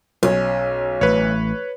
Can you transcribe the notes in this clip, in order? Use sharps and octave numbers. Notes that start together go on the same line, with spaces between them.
B1 C#4
A1 B4 C#5